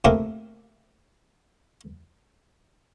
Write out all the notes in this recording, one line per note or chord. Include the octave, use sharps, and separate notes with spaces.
C3 A3 A#3 E4 G4 A#4